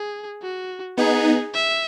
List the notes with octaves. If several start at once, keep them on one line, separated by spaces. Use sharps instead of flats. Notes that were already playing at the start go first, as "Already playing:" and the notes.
Already playing: G#4
F#4
B3 D#4 G#4
E5